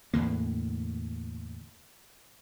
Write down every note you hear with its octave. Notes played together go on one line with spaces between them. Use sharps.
E2 A2 D3 A#3